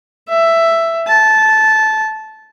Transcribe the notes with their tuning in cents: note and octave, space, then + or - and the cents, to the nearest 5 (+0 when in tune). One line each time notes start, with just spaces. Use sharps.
E5 +10
A5 -15